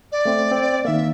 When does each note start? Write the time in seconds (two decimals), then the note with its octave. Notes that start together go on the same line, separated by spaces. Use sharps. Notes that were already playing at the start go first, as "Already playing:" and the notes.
0.12 D5
0.25 A3 C4
0.51 C4
0.85 D#3 A#3 E5